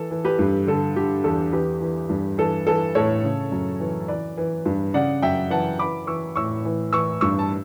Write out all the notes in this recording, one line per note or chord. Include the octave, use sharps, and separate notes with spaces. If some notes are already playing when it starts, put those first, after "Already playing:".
Already playing: E3 A4
E3
G4 B4
G2
D3 A4
D3 G4
E2 A4
E3 G4 B4
E3
G2
E3 A4
E3 A4
A2 A4 C#5
C#3
F#2
E3
E3 B4 D5
E3
G2
C#3 D5 F#5
F#2 E5 G5
E3 F#5 A5
E3 B5 D6
E3 C#6 E6
A2 C#6 E6
E3
E3 C#6 E6
G2 C#6 E6
A5